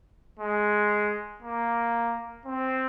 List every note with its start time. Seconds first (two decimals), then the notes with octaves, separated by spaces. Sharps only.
0.40 G#3
1.43 A#3
2.46 C4